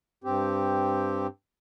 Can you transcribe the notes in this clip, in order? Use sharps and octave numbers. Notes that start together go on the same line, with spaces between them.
G2 C4 G4